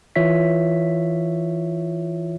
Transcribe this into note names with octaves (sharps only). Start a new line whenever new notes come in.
E3 F4 C#5 E5 B6